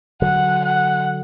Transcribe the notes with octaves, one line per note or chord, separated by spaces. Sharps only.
D3 F#3 F#5
F#5